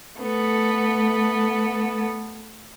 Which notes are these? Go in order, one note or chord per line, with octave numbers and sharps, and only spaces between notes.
A3 B3 A4